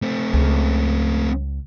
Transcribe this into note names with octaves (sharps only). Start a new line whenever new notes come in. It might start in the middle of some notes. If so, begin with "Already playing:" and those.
A3 C4
C#2